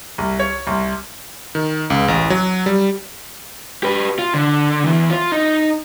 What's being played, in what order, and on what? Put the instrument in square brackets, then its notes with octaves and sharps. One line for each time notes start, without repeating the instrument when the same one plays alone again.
[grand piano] C2
C#5
C2
[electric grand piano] D#3
C#2
A1
F#3
G3
[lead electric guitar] G4 B4
F4
D3
E2 E3
F4
D#4